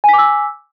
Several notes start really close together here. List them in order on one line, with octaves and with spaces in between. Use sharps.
G#5 B6 D6 E6